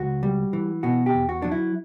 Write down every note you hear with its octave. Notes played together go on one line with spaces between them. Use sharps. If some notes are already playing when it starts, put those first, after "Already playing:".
Already playing: C#2 F#4
G3
E3
B2 F#4
G4
E2
F#4
F#3 D4
E4